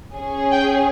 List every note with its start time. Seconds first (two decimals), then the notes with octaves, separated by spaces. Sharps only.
0.15 C#4 G#4
0.51 G5